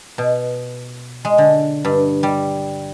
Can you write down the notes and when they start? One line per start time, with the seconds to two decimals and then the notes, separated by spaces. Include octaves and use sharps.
0.18 B2
1.25 G#3
1.38 D3
1.85 G2
2.23 G3